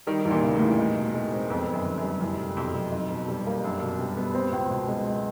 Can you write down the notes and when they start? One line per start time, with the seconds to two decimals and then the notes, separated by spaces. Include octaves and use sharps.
0.07 D#3 G3
0.25 E2
0.31 A#2
0.43 C#3
0.55 A2
0.61 E3
0.78 D#4
0.96 B2
1.14 G#3
1.32 C4
1.50 F2 B3
1.68 D#2
1.74 F#2
1.86 D3
1.98 F#2
2.03 G3
2.21 C2 F#2
2.39 C2
2.57 F2 B2
2.75 F#3
2.92 D#4
3.10 B2
3.28 G3
3.47 A#3
3.64 F#2 D4
3.82 B2
4.00 G3
4.17 B3
4.35 C4
4.52 C#2
4.71 B2
4.88 G#3